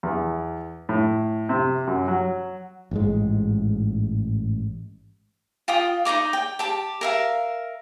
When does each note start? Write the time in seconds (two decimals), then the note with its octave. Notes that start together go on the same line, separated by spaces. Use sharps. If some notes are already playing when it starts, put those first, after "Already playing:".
0.03 E2
0.89 A2
1.49 C3
1.87 F#2
2.08 F#3
2.91 A1 G#2 G#3
5.68 F4 G5 D#6
6.05 D#4 D5 D#5 D6
6.33 G5
6.59 G4 A5
7.01 A#4 E5 F5